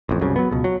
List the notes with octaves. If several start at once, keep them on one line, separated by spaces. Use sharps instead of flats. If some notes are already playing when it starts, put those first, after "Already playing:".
A1 F2
C2 F#2 C#3
F#3 B3
C#2 B2
F#3